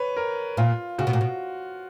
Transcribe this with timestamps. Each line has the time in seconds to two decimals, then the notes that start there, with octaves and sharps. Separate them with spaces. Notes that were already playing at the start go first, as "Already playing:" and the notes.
Already playing: B4 C#5
0.17 A#4
0.57 A#2 F4
0.98 C#3 F#4
1.07 B2
1.13 A#2
1.21 B2